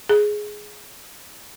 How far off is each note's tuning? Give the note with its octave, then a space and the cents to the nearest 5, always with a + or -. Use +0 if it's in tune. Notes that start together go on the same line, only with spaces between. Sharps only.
G#4 +5